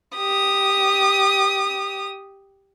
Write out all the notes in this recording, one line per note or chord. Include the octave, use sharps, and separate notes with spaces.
G4 D#6